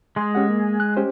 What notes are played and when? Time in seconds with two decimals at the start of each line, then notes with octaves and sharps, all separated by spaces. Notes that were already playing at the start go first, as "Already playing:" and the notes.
0.16 G#3 G#4 C6
0.35 C#4 G4 F#5
0.50 A#3
0.80 F#6
0.97 C#4 G4 C5